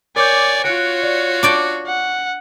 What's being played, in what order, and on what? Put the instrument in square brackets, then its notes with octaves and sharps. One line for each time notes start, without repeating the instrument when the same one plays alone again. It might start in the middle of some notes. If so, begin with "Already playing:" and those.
[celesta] A#4 D6 G6 [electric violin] C#5 G#5 [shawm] D5
[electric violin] F4 C#5 [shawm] F#4 [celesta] F#6 C#7 D7
[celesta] D5
[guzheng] D4 D5 G5 [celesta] C#6
[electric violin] F#5